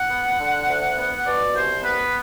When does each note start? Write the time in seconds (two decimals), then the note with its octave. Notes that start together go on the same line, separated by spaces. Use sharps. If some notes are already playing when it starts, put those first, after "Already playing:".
Already playing: F#5
0.10 B3
0.39 D3
0.68 D2
0.97 B3
1.26 B2 D5
1.54 C2 C5
1.83 B3 B4